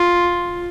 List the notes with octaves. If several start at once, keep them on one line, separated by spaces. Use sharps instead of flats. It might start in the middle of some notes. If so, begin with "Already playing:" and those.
Already playing: F4